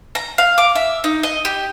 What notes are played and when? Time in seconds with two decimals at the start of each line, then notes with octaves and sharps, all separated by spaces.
0.15 A#5
0.38 F5
0.58 D6
0.75 E5
1.04 D#4
1.23 D#5
1.45 G4